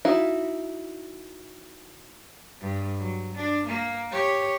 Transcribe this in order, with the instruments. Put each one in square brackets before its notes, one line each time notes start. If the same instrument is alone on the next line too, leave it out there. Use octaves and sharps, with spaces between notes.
[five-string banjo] D#4 E4 F#4 F5
[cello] G2
F#3
D4
A#3
G4 C#5